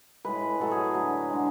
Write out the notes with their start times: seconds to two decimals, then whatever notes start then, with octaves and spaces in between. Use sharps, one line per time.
0.25 A2 G#3 B4
0.60 A2 F#3 A3 A4
0.71 G#4
0.94 D3 F#3 A3
1.30 D3 G#3